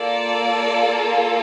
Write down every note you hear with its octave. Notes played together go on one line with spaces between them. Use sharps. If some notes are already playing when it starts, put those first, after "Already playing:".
Already playing: A#3 F4 A4 D5